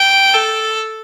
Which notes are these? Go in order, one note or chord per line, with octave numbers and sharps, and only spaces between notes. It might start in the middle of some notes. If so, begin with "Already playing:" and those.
Already playing: G5
A4